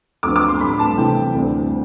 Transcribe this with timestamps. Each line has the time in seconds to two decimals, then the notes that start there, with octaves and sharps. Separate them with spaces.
0.23 D2 D3 F3 B3 D6
0.36 D6
0.48 C6
0.61 A2 G3 D4 B5
0.79 A5
0.98 C3 E3 A3 C4 E4 G5
1.35 D2 D3 G3 C4